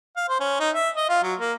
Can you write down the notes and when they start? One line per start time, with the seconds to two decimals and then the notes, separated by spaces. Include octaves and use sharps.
0.17 F5
0.29 C5
0.40 C#4
0.60 D#4
0.75 E5
0.97 D#5
1.09 F4
1.23 F#3
1.40 A#3